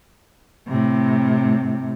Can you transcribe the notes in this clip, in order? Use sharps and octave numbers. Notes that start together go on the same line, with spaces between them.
A2 C3